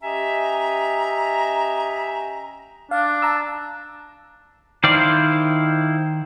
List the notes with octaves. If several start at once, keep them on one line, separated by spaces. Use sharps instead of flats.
C#4 G4 D#5 E5 G#5 A#5
D4 F5
A5 A#5 E6
D#3 E4 C5 D5 F5